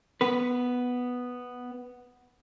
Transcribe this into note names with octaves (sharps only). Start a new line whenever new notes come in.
B3 B4